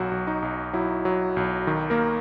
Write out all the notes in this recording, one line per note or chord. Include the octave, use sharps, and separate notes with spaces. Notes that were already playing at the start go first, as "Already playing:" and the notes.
Already playing: B1 F#3 F#4
B1
D#4
B1
F#3 E4
F#3
B1
D#3
A#3 A#4